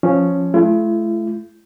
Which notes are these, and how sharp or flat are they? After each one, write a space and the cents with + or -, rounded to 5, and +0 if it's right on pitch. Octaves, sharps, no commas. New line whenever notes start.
F3 +5 C#4 +0
A3 -40 E4 +45